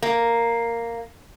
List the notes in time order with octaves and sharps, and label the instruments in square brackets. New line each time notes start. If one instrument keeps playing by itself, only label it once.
[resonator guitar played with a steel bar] A#3